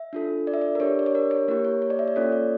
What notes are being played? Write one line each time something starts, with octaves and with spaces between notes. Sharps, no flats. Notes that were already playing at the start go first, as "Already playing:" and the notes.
Already playing: E5
D4 F4 A4
D5
E5
D5
A#4
D4 G4 C#5
D5
C#5
A#4
C#5
A#3 E4 G4 A#4
C#5
C#5
D5
E5
D5
A#3 C#4 F4 A4 C#5
D5